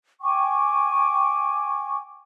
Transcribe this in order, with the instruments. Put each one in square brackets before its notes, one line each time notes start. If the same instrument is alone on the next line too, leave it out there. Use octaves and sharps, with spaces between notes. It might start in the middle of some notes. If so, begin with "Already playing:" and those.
[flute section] G5 G#5 C#6 D6